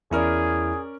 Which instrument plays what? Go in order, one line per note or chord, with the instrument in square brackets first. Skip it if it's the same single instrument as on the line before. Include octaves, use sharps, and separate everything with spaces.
[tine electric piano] E2 E4 F6 [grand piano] C#4 A#4 D5 [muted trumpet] G#4